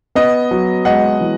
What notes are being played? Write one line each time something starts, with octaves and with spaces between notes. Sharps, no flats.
B3 D#5
F#3
G#3 D#5 F#5
E3